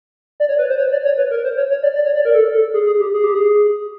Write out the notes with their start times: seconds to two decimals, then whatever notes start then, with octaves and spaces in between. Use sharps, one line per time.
0.40 D5
0.49 C#5
0.58 B4
0.69 C5
0.78 C#5
0.92 D5
1.05 C#5
1.17 B4
1.31 A#4
1.44 C5
1.57 C#5
1.70 C#5
1.83 D5
1.95 D5
2.05 C#5
2.15 D5
2.25 A#4
2.34 A4
2.54 A4
2.74 G#4
2.86 G#4
3.00 G4
3.13 G#4
3.24 G4
3.35 G#4